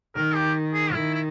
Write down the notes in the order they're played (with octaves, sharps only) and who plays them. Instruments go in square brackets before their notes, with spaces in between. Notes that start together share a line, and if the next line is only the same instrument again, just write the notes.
[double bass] D#3 [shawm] A#4
[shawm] G4
G#4
[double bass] D#3 [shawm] E4
[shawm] E4